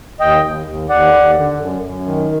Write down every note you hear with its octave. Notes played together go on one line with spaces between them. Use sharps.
D#2 D#5 G5
D#2
D#2
D#2 D5 F#5
D#2
D3
F#2
F#2
D#3